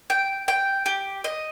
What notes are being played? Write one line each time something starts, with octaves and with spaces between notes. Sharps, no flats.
G5
G5
G4
D#5